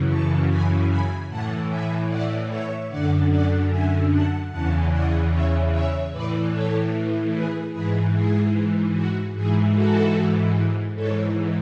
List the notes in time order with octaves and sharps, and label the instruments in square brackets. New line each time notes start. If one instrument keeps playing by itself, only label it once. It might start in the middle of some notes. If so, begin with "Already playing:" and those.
Already playing: [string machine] F#2 C#3 E3
A5 C#6
G#5 B5
G#5 B5
A2 E3 F#5 A5
E5 G#5
D5 F#5
C#5 E5
F#2 D3 D5 F#5
D5 F#5
E5 G#5
F#5 A5
E2 C#3 E3 F#5 A5
D5 F#5
C#5 E5
C#5 E5
A2 E3 B4 D5
A4 C#5
G#4 B4
G#2 E3 G#4 B4
G#4
F#4
G#2 E3 G#4
F#4 A4
G#2 E3 A4 C#5